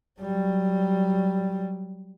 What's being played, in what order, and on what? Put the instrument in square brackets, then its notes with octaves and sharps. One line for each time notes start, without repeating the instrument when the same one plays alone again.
[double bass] F#3 G3